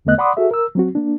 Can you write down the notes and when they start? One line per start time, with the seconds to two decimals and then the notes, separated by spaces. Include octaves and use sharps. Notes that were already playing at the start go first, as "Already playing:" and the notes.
0.05 E2 D3 A3 B3 D#5 F#6
0.18 D5 F#5 B5 C6 D6 D#6
0.37 F#4 G#4 A4 E5
0.51 A#4 E6
0.75 F#3 C4 F#4
0.95 A#3 D4